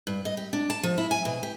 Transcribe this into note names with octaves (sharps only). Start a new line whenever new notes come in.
G2
D#5
G4
D4
A5
F3
E4
G#5
B2
G4